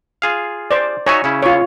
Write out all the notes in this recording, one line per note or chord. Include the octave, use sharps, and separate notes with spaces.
F4 G#4 F5
C5 D5
D#4 F#4 C#5 E5 G#5
C#3 C#4 E4
F4 C#5